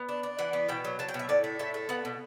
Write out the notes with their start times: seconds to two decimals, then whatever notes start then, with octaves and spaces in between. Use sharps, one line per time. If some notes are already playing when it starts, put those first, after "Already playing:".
Already playing: B3
0.09 D4
0.23 D4
0.39 E3 F#5
0.53 B3
0.69 B2 G5
0.85 F#3
0.99 F#3 A5
1.08 G5
1.14 B2
1.19 E5
1.29 A2 D5
1.44 A3
1.59 A2 E5
1.74 A3
1.89 B3 F#5
2.05 B2